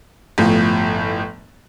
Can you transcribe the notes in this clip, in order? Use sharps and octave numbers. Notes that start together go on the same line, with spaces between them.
G1 A2 F3